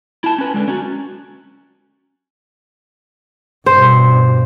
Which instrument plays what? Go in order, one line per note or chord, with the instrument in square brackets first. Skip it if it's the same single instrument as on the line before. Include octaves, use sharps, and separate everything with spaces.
[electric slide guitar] E4 A5
C#4 B4
D3 G#3
C#4 F#4
[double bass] G2 B2 [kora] C5